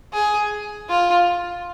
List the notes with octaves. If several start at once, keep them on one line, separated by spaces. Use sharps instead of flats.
G#4
F4